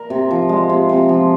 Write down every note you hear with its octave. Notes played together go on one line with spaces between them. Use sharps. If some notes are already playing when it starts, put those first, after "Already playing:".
Already playing: A#4
C3
F3
G#3
C3
C3
F3